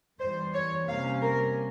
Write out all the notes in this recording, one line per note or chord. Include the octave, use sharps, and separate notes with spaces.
E2 E3 G3 C5
C#5
C3 G3 A#3 C#4 F5
A#4